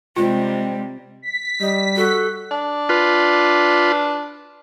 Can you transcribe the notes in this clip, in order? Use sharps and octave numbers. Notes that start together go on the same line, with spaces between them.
C3 G3 G#3 C4 F4
B6
G3 D#5
F#4 A4
D4
F4 B4